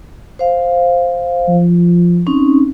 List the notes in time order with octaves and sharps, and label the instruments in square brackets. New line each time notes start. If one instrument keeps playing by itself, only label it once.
[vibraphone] C5 F5
[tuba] F3
[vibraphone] C4 C#4 D#4